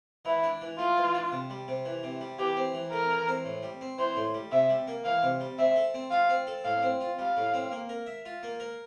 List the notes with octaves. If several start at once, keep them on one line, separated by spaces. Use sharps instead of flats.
E3 E4
D4
E3
A3 F4
E3
D4
C3
G3
C3
E3
C3
G3
E3 G4
C4
E3
A3 A#4
E3
C4
A2
G3
C4
E3 C5
A2
G3
C3 E5
G3
A#3
E3 F5
C3
G3
C4 E5
A4
C4
F4 F5
C4
A4
A2 F5
C4
F4
G3 F5
A2
C4
A#3
A#4
E5
F4
A#3
A#4